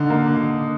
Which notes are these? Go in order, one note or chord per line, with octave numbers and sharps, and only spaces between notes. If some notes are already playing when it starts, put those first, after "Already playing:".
Already playing: D3 D#4
A#3
D3